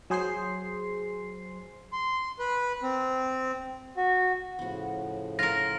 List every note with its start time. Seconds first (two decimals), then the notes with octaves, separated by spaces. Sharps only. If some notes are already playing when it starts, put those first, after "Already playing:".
0.10 F#3 G#4 C5 C6 C7
1.93 C6
2.39 B4
2.83 C4
3.97 F#4
4.59 A2 C#3 F3 B3 F#4
5.39 F4 A#4 A#6